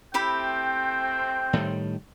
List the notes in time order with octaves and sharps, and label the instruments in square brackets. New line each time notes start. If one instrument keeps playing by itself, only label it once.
[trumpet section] A3 C4 [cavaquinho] E4 G4 B5 [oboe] G5
[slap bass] A2 D#3 G3